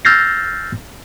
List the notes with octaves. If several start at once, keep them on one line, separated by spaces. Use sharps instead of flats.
E6 F6 G6 A6 A#6 C7